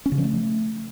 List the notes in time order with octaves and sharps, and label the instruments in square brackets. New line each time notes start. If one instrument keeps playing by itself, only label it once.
[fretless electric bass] C#4
C#3
F3
A3